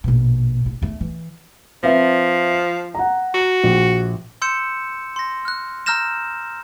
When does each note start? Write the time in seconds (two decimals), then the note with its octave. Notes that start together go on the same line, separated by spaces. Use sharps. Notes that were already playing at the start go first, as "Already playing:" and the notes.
0.04 A#1 B2
0.66 A#1
0.82 E2 A3
1.01 E3
1.83 F3 C4 B4 E5
2.94 F#5 A#5
3.34 F#4
3.63 A#1
4.42 C6 E6 G6 C#7 E7
5.16 C6 A#6
5.45 F6 F#6
5.86 A#5 E6 F6 G6 A#6 E7